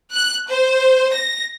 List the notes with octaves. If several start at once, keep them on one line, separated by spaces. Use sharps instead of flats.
F#6
C5
A#6